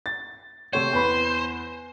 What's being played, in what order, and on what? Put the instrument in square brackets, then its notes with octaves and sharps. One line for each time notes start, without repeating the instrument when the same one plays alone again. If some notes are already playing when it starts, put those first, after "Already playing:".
[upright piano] A6
[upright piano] C3 A3 C#5 [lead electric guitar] C5
[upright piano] E2 B4 B5